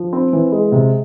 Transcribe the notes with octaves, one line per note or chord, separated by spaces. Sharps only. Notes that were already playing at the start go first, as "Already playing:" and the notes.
Already playing: F3
C4
E3
G#3
C3